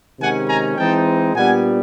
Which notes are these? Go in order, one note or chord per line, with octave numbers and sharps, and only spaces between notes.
C3 D#3 G#3 C#4 F#5 G#5
G#5 A#5
E3 G#3 C4 D#4 G5 A5
A#2 G3 B3 D4 F#5 G#5